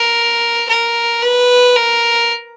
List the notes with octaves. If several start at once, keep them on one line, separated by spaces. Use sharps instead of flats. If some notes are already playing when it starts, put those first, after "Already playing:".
Already playing: A#4
A#4
B4
A#4